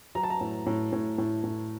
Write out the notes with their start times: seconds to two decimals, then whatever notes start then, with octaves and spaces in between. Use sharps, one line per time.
0.15 F#3 A#5
0.23 A5
0.30 A#5
0.41 A2
0.66 A2
0.92 A2
1.18 A2
1.44 A2